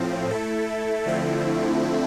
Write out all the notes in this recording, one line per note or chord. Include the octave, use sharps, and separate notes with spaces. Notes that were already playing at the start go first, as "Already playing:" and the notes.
Already playing: A2 F3 C4
A3 E4 A4
D3 F3 A3 C4 E4